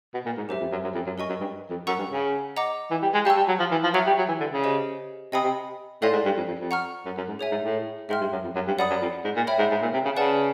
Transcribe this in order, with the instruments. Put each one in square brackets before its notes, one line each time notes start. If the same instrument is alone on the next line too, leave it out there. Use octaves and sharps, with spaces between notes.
[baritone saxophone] B2
A#2
G#2
[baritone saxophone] F#2 [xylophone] G4 C5 E5
[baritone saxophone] F2
F#2
F#2
F2
F#2
[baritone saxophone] F#2 [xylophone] A#4 D#5 G#5 C#6
[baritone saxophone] F#2
G2
F2
[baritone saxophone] F#2 [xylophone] F#5 A#5 C#6 E6
[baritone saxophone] G2
C#3
[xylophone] D#5 F#5 A#5 D6
[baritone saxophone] E3
G3
G#3
[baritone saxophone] G3 [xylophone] F5 A5 C#6 E6
[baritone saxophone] G3
F#3
F3
E3
F3
[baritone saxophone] F#3 [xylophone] E5 G#5 C#6 F6
[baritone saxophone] G3
F#3
E3
D3
C#3
[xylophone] G4 C5 D#5 G#5
[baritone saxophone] C3 [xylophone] D#5 G#5 B5 D#6
[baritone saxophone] C3
[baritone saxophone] A2 [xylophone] A4 D5 F5 G#5 C6
[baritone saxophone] G#2
G2
F2
F2
F2
[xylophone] F#5 A#5 C#6 F6
[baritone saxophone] F#2
F#2
G#2
[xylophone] G#4 C#5 E5 G#5
[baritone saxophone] G#2
A2
[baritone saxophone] G#2 [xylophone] E5 G5 C6 F6
[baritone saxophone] G2
F#2
F2
F#2
G2
[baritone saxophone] F#2 [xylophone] D5 F#5 B5 D#6
[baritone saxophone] F#2
F2
G#2
A#2
[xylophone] C#5 E5 G5 B5
[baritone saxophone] G#2
G#2
A#2
C3
C#3
[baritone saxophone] C#3 [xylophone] B4 D5 F#5 A5